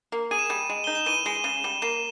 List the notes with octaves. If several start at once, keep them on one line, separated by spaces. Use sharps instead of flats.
A#3
G#4 D#7
E7
G3 D#7
G#3
D#4 G7
E7
E3 D#7
G#3
C#3
G3
A#3 E7